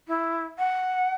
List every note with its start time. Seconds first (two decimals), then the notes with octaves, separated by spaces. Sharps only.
0.08 E4
0.59 F#5